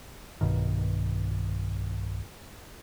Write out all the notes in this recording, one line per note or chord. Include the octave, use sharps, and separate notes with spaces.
B1 G2 B2 D#3